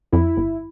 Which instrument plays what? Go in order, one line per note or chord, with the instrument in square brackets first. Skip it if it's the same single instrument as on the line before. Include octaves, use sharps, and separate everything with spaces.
[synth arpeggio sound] F2 [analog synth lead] E4
[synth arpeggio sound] G1